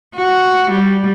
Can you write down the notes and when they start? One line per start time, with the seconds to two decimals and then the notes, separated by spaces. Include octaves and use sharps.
0.16 F#4
0.71 G3